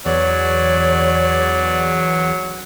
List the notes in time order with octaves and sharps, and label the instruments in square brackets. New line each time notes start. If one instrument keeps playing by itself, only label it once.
[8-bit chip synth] E2 [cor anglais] F#3 [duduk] C#5 [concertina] D5